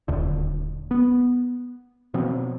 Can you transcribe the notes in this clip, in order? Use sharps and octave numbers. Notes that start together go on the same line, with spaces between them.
D#1 D2 D3
B3
B2 F3 B3 C4